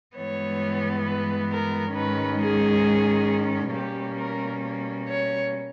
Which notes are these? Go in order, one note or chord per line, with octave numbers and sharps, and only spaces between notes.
G2 E3 G#3 B3 C#5
B4
A#4
G#2 D#3 G#3 C#4 B4
G#4
B2 G3 A#3 C#4 G4
A#4
C#5